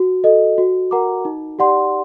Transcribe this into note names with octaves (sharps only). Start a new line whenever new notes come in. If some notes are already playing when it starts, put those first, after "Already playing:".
Already playing: F#4
A4 D#5
F#4
A#4 F#5 A#5 D6
D#4
G4 D5 F#5 C6